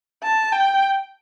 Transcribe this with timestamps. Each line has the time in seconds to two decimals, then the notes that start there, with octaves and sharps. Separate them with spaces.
0.23 A5
0.52 G5